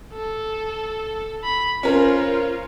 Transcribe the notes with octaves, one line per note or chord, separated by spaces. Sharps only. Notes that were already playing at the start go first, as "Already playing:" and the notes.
A4
B5
C#4 F4 A#4 C5